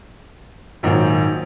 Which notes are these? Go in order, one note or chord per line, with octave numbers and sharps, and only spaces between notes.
A#1 G#2 D#3 F#3